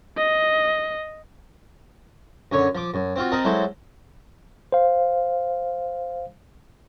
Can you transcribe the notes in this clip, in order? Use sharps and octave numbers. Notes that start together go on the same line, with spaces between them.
D#5
F#2 D3 C#5
F3 D6
F#2
C4 F4 F#4
C4 A#4 D#5 A5 B5
F#3 G#3 E4 A4 C5
C5 F5